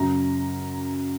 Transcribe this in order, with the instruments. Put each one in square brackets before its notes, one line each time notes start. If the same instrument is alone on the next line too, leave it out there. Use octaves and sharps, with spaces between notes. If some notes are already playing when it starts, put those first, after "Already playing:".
Already playing: [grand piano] F#2 C#3 A#5